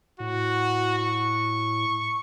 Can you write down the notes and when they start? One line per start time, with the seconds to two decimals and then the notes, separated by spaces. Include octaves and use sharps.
0.20 A2 F#4
0.98 C#6